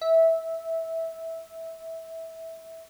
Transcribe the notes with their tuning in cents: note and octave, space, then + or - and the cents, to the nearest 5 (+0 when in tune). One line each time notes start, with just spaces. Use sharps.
E5 -15